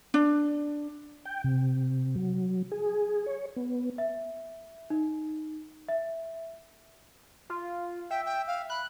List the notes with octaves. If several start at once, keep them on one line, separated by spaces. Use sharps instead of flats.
D4
G5
C3
F#3
G#4
C#5
B3
E5
D#4
E5
F4
E5 G5
G5
F5
B5 F#6